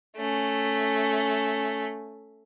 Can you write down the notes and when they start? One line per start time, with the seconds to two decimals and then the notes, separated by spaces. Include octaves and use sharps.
0.17 A3 C#4